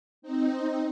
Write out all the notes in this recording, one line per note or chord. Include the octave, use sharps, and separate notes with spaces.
C4 D#4